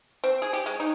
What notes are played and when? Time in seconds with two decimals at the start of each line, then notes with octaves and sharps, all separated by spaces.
0.24 C4
0.42 G#4
0.53 G4
0.66 G#3
0.80 D#4